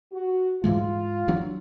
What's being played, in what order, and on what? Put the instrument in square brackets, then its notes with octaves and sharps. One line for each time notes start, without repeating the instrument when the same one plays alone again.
[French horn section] F#4
[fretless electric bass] G#2 E3 G#3 [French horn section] F4
[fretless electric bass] E3 F#3 D4